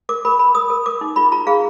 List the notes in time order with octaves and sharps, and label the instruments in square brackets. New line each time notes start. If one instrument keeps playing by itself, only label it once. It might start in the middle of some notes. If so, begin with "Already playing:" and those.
[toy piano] A#4 D6
A#4 B5
A#4 B5
A#4 D#6
A#4
A#4 D6
D#4
F4 B5
F4 A#5
G#4 F5